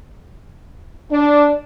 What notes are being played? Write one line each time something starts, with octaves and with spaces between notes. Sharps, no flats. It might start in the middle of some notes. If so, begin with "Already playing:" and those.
D4